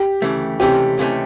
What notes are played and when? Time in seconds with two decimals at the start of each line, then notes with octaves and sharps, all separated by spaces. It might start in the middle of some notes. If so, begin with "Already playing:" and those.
Already playing: G4
0.22 D2 C#3 E3 A3
0.60 C#2 C3 E3 A3 C#4 G4
0.98 C#2 C3 E3 A3 C#4